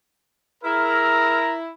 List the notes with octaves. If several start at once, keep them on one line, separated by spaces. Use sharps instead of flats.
E4 G#4 A#4 A#5 E6 F6